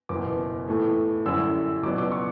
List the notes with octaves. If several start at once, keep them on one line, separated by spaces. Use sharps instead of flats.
F#1 E2 B2 D6
A2 E3 A3
F#2 D3 G3 C#4 E4 E6
C#2 B2 F#3 B3 D4 D6
D6
C#6